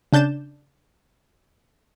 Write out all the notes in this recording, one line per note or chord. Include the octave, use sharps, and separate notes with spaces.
C#3 D4 G6 A6 E7